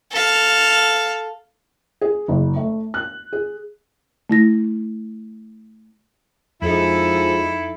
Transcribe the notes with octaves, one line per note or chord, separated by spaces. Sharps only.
A4 F5
G#4
F#1
A3
F#6
G#4
A3 E4 A#6
F2 F3 G#3 D#4 E4 A4